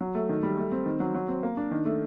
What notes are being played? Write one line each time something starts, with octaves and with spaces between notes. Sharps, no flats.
F#3
A3
D#3
G3
A3
C4
D#3
F#3
F#3
C4
A#3
D4
D#3
A3